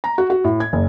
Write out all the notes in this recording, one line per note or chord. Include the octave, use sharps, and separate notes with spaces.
A#5
F#4
F#4
A2
G#6
F#1